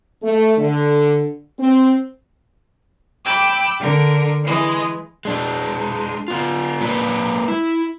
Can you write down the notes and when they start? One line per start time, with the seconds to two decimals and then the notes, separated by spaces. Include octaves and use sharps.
0.23 A3
0.58 D3
1.59 C4
3.25 G5 B5 D6 E6
3.79 D3 A#4
4.43 E3 G#3
5.25 G#3 D4
6.28 B3 F4
6.81 G#3 A#3 B4 D5
7.48 E4